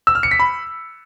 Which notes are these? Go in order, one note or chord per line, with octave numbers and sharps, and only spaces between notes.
E6
F6
C#7
B6
B5